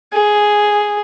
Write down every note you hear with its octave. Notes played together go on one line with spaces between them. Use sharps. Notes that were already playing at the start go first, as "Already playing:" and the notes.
G#4